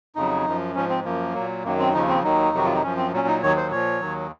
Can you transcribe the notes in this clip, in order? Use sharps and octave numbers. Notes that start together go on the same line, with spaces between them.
F2 C#3 F#3 D#4
F#2 F3
G#2 F3 C#4
C4
F#2 F3 A#3
A#2 F#3
F#2 D#3 F#3 A#3
C4
D#2 C#3 F3 D#4
C4
D#2 D#3 F#3 D#4
F2 C3 D#3 F#3 F#4
F4
D#4
F#2 F3 C#4
C4
A#2 F#3 C#4
D#4
D#2 D#3 F#3 C#5
C5
A#2 F3 C#5
D#2 D#3 F#3